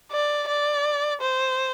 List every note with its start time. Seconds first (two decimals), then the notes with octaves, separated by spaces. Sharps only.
0.11 D5
0.48 D5
1.21 C5